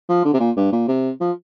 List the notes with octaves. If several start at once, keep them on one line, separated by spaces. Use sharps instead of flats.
F3
D3
C3
A#2
G2
A#2
C3
F3